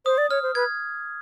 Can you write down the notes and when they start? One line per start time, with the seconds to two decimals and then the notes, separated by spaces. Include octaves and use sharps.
0.06 C5 D#6
0.18 D5
0.30 C#5 F6
0.43 C5
0.55 B4 G#6